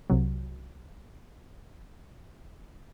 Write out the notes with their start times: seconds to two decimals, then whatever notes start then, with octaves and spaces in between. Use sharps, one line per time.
0.10 C2 C3 F#3